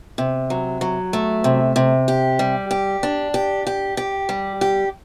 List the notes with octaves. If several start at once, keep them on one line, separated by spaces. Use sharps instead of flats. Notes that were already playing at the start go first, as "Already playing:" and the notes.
C3
F#3
F#3
A3
C3
C3
G4
G3
G4
D4
G4
G4
G4
G3
G4